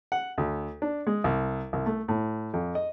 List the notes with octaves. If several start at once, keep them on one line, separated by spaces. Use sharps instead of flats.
F#5
D2
D4
G#3
C2
C2
A3
A2
F2
D#5